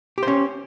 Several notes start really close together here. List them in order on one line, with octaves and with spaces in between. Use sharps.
G4 C5 C#4